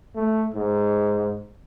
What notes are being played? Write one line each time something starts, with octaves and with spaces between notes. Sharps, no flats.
A3
G#2